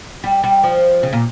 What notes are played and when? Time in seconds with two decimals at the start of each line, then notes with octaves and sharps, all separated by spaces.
0.24 G3
0.44 G3
0.63 F3
1.03 C#3
1.13 A#2